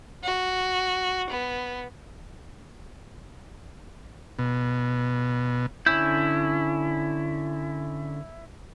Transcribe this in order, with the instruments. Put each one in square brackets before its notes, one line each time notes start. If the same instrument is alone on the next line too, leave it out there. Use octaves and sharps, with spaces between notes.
[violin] F#4
B3
[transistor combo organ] B2
[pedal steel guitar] D3 C#4 G6 [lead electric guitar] E4